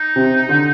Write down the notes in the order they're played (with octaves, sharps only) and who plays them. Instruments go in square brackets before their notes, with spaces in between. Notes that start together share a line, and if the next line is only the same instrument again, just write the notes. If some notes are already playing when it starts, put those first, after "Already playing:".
Already playing: [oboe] D#4
[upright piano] C3
D3